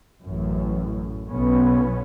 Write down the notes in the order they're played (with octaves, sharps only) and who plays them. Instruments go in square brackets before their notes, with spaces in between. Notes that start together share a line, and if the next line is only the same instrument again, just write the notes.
[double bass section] A1 F#2
B1 B3 C#4